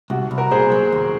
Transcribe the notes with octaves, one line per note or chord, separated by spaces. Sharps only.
C2 F#4
C2
F#4 A#4
A#2 G#4 C5
F#3
D#2